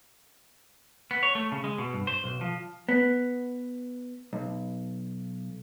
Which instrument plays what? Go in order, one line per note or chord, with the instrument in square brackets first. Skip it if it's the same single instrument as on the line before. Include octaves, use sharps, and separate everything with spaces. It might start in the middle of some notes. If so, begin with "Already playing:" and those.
[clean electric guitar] B3
C#5
A3
C#3
G#3
B2
G2
C5
B1
F3
[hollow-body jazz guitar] B3
B1